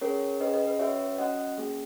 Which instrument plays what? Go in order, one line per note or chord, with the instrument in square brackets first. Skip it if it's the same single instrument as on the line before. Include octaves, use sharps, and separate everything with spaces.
[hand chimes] C#4 G#4 A#4 C#5
C#4 G#4 B4 D#5
B4 D#5
B4
C#4 F#4 C#5 E5
C#4 F#4 D#5 F#5
A#3 C#4 G#4